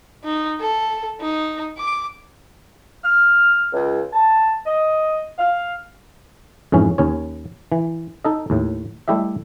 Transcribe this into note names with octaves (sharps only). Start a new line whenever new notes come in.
D#4
A4
D#4
D6
F6
C#2
A5
D#5
F5
F2 G#2 E3 C#4
D#2 C#4 C#5
E3
D#4 A4 D#5
D#2 A2
G3 A3 E4 G4 D#5 E5